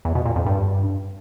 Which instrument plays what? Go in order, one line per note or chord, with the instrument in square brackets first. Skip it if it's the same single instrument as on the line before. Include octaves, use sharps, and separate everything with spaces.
[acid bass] E2
B2
A#2
F2
G2